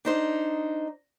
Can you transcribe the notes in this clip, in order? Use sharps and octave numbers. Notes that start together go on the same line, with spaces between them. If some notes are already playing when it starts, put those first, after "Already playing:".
D4 D#4 C5